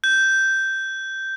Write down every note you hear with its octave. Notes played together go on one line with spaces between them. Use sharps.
G6